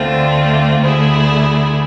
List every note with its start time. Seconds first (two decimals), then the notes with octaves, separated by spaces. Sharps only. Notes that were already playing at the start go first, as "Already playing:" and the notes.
Already playing: D2 D3 A3 C4 F4
0.81 D2 D3 A3 E4 G#4